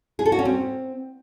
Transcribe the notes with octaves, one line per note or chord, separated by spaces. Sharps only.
G#4
A4
F#4
C#4
C4